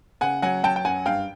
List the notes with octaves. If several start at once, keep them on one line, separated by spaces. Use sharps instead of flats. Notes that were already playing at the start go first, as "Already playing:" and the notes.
C#3 F#5 G#5
F#3 F#5 G#5
F#3 G5 A5
G5
F#2 F#5 G#5
G2 F5 G5